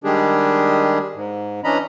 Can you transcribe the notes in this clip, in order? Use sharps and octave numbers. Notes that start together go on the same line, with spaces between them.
D#3 G3 G#3 D4 G4 G#4
G#2
E3 C#4 D4 D#5 A#5 B5